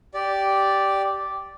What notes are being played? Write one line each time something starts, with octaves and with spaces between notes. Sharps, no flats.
G4 D5